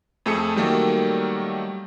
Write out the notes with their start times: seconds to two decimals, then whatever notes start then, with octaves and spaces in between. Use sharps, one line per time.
0.26 F2 A3 G#4 E6 C#7
0.56 D#3 F#3 G3 A3 A#3